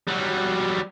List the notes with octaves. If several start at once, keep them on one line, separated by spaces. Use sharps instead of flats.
F#3 G3